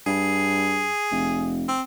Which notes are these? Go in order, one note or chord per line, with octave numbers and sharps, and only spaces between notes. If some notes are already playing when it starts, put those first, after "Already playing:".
G2 G#4
F1
C4